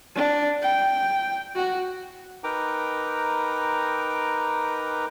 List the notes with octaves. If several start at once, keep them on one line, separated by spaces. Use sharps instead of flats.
D4
G5
F#4
D#4 A#4 B4 G5 A#5 D6